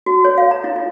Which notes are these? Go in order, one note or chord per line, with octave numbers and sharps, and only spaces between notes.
F#4
C#5
F5
A#5
E4
F4